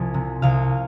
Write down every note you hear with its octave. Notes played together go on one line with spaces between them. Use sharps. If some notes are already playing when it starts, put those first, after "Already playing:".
Already playing: C2 F3 G#5
C3
C2 F5